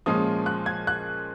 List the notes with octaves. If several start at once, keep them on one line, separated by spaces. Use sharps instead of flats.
A#2 F3 G#3 C#4 D#6
F#6
G#6
F#6